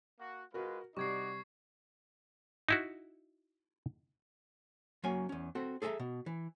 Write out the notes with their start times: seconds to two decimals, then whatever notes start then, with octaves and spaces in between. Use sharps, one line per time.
0.20 A#3 F#4
0.54 G#3 F4 F#4 A#4 B4
0.97 C3 G3 D#4 F#4 D5 C#6 G#6 C7
2.69 D#4 E4 F#4
5.04 F#3 A#3 C#4 G#5
5.29 E2 C#4
5.55 C4 F#4 A4
5.82 G#4 A4 E5 A5 A#5
6.00 B2
6.26 E3